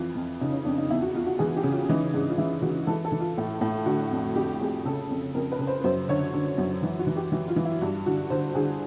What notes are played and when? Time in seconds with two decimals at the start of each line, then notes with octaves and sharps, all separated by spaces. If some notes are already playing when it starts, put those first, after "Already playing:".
Already playing: F2 E3 F4
0.15 F2
0.41 C#3 D#4
0.53 C#4
0.65 F2 D4
0.78 D#4
0.90 E2 E4
1.02 F#4
1.15 E2 F4
1.26 F#4
1.39 E3 G#4
1.56 G4
1.64 C#3
1.72 F4
1.89 E3 D#4
2.13 G#2 D4
2.28 F4
2.38 E3 E4
2.62 E3 F#4
2.87 E3 A4
3.05 A4
3.12 E3
3.20 F4
3.38 A2
3.61 A2
3.86 D3 F#4
4.11 F2
4.35 F2 G4
4.61 F2 G#4
4.85 C#3 A4
5.10 F2
5.35 F2 A#4
5.52 B4
5.59 C#3
5.67 C5
5.84 F#2 C5
6.09 D3 C#5
6.33 D3
6.58 F#2
6.83 E3
6.99 F#4
7.07 E3
7.16 G4
7.32 E3 F#4
7.48 F4
7.56 E3
7.65 E4
7.81 G2 F#4
8.06 D3 F#4
8.30 D3 C5
8.55 D3 G#4